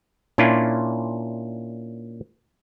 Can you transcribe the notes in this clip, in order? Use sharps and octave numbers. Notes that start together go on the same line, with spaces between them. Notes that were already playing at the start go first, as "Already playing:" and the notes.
A#2 C#4 D4 E4 F4